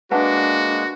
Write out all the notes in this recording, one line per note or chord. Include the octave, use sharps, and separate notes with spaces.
G#3 A#3 D4 F#4 B4 F#5 A5